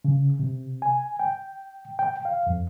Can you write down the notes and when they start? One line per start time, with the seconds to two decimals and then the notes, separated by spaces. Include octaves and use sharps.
0.05 C#3
0.39 C3
0.82 G#5
1.19 G5
1.99 G5
2.25 F5
2.47 F2